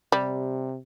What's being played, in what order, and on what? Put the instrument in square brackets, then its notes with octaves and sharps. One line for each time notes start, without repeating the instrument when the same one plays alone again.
[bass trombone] C3 [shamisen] G3